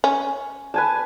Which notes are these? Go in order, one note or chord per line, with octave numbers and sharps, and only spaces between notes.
C#4
B4 G#5 A5